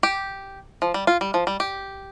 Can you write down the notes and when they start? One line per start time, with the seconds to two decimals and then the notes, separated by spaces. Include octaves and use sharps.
0.03 G4
0.82 F3
0.94 G3
1.07 F4
1.21 G3
1.34 F3
1.47 G3
1.60 G4